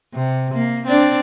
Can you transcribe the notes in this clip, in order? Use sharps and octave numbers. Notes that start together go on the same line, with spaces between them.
C3
A#3
C4 D4 D5